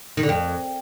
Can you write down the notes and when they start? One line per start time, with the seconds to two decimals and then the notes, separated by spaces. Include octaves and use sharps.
0.17 D#3
0.23 D3
0.29 F2